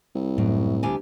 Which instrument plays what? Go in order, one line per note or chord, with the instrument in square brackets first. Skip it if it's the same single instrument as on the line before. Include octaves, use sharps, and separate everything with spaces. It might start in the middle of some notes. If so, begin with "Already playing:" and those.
[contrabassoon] C2
[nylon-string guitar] F#2 [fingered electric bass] A2
[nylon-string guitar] D2 G4 G#5